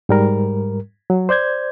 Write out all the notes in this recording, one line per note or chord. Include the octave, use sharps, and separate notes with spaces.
G#2 G3 A#4
F#3
C5 D5 G6 G#6